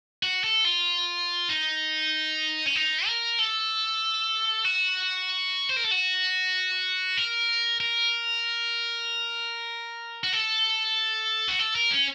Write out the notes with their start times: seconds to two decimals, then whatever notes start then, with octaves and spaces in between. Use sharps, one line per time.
0.23 F#4
0.44 A4
0.65 F4
1.49 D#4
2.66 C#4
2.75 D#4
3.06 A#4
3.39 A4
4.65 F#4
5.70 C5
5.77 A#4
5.84 A4
5.91 F#4
7.17 A#4
7.80 A#4
10.24 F#4
10.33 A4
11.48 F#4
11.59 A4
11.75 A#4
11.91 C#4